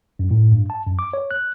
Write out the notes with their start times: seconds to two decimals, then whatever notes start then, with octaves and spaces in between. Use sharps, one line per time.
0.19 F#2
0.31 A2
0.51 G2
0.70 A5
0.87 F#2
0.99 D6
1.13 C#5
1.31 F#6